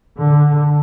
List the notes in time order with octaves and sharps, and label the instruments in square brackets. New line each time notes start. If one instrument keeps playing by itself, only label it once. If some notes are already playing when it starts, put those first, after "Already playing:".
[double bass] D3